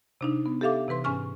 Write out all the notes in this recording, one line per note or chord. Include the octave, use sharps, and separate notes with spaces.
C3 D4 D#4
B3
G4 A4 E5 F5 D6
C3 E3 B4 C6
G#2 C#4 G#5 C#6 F6